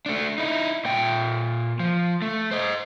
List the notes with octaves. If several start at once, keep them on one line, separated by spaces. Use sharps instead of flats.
A3 D4
D#4 E4
A#2 G5
F3
A3
C5 D#5